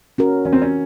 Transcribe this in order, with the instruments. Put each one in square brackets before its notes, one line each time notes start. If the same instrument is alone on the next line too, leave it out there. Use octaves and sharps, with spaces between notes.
[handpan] C#4 F#4 A#4
[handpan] E3 [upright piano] C#4
[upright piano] C4
C#4